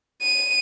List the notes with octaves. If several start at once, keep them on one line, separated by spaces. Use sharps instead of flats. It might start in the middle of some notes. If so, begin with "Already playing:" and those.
D#7